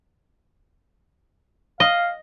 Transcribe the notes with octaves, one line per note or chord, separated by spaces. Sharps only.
D#5 F5